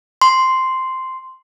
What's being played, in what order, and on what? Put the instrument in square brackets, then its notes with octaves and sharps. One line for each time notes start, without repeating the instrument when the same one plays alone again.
[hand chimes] C6